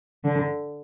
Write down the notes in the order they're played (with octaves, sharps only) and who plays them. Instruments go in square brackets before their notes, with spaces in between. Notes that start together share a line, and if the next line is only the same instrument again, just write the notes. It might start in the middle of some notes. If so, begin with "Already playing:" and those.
[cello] D3